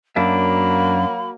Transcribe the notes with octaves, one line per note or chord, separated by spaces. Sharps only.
F#2 F#3 A#3 D4 E5 B5